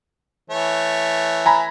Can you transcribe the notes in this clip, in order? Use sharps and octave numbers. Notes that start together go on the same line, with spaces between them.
E3 A3 C#5
G#5 A#5 B5